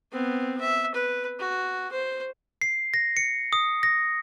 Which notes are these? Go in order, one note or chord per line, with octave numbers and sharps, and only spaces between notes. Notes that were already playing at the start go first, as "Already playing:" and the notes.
B3 C4
E5
B4
F#4
C5
C7
A#6
C#7
D#6
A#6